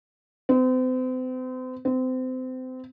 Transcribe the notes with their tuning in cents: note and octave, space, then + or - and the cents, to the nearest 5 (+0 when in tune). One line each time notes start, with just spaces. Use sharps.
C4 -40
C4 -30